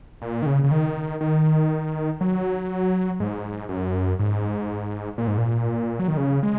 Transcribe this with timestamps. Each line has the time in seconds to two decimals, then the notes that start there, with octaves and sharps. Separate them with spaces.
0.22 A#2
0.42 D#3
0.46 C#3
0.64 C#3
0.71 D#3
1.21 D#3
2.21 F#3
3.20 G#2
3.69 F#2
4.19 G#2
5.18 A#2
5.28 G#2
5.38 A#2
5.99 F#3
6.08 D#3
6.17 C#3
6.43 G#3